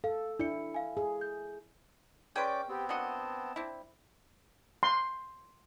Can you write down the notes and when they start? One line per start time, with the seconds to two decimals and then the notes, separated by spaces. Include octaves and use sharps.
0.04 A4 F5
0.39 D4 E4 D5 C#7
0.74 F5 G#5
0.97 G#4
1.21 G6
2.36 C#4 G#4 B4 D5 G5 C6 D6
2.69 B3 C4 G4
2.89 A#3 D4 F#4 D#5 A5
3.56 C4 D4 E4
4.83 C6